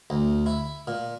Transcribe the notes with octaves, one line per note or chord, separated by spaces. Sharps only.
D2
E4
A#2